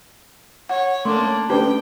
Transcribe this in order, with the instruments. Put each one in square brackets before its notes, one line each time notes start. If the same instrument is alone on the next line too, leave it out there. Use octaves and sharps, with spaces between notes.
[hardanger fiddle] C#5 [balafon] F#5
[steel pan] A3 C#4 C#5 [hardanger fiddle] A#3 D4 [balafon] C6
[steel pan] A3 D4 G4 [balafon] C#4 B4 C5 [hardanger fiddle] G5